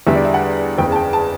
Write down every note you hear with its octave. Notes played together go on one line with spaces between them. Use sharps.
E2 D3 G3 E5
D5
E5
F#5
F#1 E2 C#3 G5
A5
G5
A5